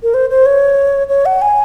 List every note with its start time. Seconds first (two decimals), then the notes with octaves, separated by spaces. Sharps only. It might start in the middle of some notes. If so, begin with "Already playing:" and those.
0.03 A#4
0.14 C5
0.30 C5
0.46 C#5
1.09 C#5
1.26 F#5
1.42 G#5